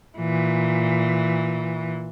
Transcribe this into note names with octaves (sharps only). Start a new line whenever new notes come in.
A#2 E3